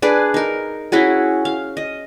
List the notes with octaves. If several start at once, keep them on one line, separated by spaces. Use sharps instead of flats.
D4 G#4 B4 D5
D#4 A#4
C#4 E4 F#4 G#4
F5
D#5